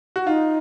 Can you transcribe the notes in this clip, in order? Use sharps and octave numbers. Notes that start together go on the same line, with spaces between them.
F#4
D#4 F4